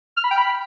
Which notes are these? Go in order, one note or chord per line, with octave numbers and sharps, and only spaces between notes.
F6
B5
G5
B5